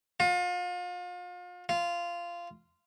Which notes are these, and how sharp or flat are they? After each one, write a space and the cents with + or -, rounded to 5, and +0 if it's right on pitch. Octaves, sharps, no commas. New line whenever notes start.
F4 +35
F4 -15